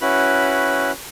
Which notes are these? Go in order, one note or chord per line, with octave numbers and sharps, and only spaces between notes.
C#4 E4 F#4 B4 B5